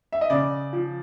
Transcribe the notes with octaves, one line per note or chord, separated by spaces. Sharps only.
E5
D#5
C#3 D5
F3